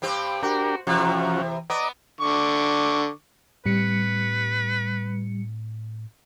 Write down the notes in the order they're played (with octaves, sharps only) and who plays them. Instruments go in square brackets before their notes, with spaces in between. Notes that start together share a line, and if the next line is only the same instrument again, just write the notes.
[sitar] G2 C4 G4
[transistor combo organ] D4 G4 A#4 [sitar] F#4
[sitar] E2 C3 [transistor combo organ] F3 C#4 F#4
[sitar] B3 [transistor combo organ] D5 D#5 A#5
[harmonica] D3 C#6 D6
[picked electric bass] A2 C4 [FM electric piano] G3 C#7 [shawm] B4